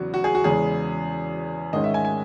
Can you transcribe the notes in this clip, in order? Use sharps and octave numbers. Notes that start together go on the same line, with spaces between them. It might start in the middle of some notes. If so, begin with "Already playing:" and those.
Already playing: E2 C#3 F#3 B3 F#4
F#4
G#4
F#4
E2 C#3 G#3 C#4 G#4
G#2 D#3 G#3 C#4 D#5
E5
G#5
G#5